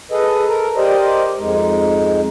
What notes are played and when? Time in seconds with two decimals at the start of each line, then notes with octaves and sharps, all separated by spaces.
0.11 G#4 A4 B4 D#5
0.49 A4 A#4 A#5
0.76 G4 A#4 C5 D5 D#5
1.39 F2 G#3 D#4